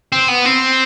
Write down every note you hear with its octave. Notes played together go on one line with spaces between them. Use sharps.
C4
B3
C4